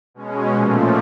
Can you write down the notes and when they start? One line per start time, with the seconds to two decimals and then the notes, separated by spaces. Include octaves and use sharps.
0.14 B2 G#3 C#4
0.54 A#2 F3 A3